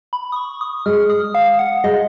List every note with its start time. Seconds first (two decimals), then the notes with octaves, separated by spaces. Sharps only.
0.13 B5
0.32 D#6
0.36 C#6
0.61 D#6
0.86 G#3 F6
1.09 D#6
1.35 F5
1.59 F#5
1.84 G#3 D#5